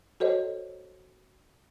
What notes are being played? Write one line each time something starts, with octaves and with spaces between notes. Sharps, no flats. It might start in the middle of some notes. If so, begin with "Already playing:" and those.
F#4 A4 C5 C#5 D#5